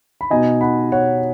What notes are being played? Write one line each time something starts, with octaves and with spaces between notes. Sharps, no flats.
B5
B2 B3 D#4 D#5 G#5
F#5 B5
C#5 F#5